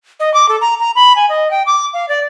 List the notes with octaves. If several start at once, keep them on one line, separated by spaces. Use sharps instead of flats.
D#5
D6
A4
A#5
A#5
B5
G#5
D#5
G5
D6
F5
D5